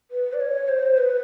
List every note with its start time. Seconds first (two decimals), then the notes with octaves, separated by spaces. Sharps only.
0.11 B4
0.33 D5
0.40 C#5
0.68 C5
0.97 B4